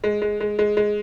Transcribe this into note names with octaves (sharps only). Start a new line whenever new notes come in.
G#3
G#3
G#3
G#3
G#3